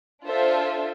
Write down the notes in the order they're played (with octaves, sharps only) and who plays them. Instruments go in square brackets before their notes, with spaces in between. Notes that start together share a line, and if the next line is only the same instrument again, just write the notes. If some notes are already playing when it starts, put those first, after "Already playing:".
[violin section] D4 F4 A4 C5 E5